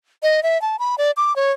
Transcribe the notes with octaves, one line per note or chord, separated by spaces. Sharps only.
D#5
E5
A5
B5
D5
D6
C#5